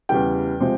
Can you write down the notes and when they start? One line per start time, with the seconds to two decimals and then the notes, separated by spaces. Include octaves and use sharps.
0.09 E2 C#3 E3 G3 G5
0.60 C3 F3 G#3